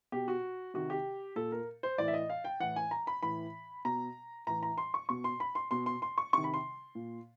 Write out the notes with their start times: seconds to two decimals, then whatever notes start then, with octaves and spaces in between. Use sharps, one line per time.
0.12 B2 G4
0.28 F#4
0.74 C3 D#3 F#4
0.90 G4
1.36 A#2 A4
1.52 A#4
1.83 C5
1.98 A2 E3 D5
2.08 E5
2.14 D#5
2.30 F5
2.44 G5
2.60 A2 E3 F#5
2.76 G#5
2.91 A#5
3.07 B5
3.23 A2 E3 B5
3.85 B2 A#5
4.47 A2 E3 A#5
4.63 A#5
4.78 C6
4.94 C#6
5.09 B2 C#6
5.24 C6
5.40 B5
5.55 C6
5.71 B2 C6
5.86 C6
6.02 C6
6.18 C#6
6.33 C3 D#3 C#6
6.44 B5
6.54 C6
6.95 A#2